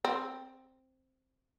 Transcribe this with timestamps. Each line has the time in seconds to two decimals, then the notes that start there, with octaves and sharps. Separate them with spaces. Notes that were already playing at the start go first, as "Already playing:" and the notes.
0.05 C4